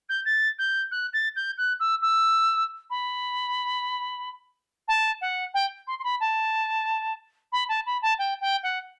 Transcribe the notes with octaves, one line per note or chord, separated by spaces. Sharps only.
G6
A6
G6
F#6
A6
G6
F#6
E6
E6
B5
A5
F#5
G5
C6
C6
B5
A5
B5
A5
B5
A5
G5
G5
F#5